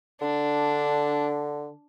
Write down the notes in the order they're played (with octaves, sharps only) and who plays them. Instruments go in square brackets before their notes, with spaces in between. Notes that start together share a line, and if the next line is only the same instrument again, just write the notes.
[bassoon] D3 [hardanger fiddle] D4